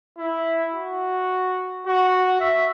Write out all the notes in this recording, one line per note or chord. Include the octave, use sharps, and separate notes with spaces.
E4
F#4
F#4
E5